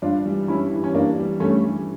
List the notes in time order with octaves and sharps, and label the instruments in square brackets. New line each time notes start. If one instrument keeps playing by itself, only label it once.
[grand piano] G2 [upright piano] D4 F4
[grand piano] E3 G3
[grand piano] G2 [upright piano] C#4 E4
[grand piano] E3 G3
[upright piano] C#4
[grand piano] G2 [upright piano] A#3 D4
[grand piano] E3 G3
[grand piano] G2 [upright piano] A3 C#4
[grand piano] E3 G3